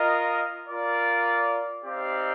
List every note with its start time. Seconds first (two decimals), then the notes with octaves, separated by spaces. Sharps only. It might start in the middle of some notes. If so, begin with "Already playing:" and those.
Already playing: F4 A#4 D#5
0.68 F4 A#4 D5
1.84 C4 D#4 G4 D5 F5